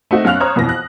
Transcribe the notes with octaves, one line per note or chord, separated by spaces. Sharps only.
A3 C4 D#4 F#4
F#2 C#4 F5 F6 F#6 F7
C5 C#5 A#5 D#6 F6
F2 B2 E3 A#6
F#6